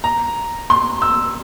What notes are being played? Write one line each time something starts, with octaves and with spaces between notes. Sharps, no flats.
A#5
C6
E6